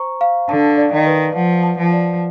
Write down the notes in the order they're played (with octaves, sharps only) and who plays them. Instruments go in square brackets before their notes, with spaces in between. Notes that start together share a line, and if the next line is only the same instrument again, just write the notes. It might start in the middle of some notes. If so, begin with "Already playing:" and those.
Already playing: [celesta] C5 A#5 C#6
F5
[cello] D3 [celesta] A5
[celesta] D5
[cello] D#3
[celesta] B4
[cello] F3 [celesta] F#5
[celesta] A5
[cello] F3
[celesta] D5